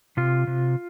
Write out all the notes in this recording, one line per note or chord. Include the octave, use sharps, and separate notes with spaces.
C3 F4
C3